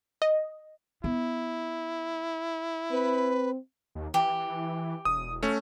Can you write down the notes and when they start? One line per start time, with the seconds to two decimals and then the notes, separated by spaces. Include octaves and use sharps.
0.22 D#5
1.04 B3 E4
2.91 C4 B4
3.95 D#2
4.14 E3 G4
5.05 E1 D#6
5.43 A3 C#4